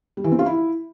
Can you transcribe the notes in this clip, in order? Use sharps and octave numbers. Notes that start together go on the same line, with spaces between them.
G3
E3
C4
F4
E4